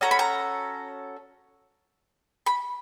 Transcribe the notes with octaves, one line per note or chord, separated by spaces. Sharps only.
C#4 F#4 A4 A#5
B5
A#5
B5